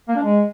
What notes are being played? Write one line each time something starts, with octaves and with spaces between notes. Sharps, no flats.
A#3
D4
G#3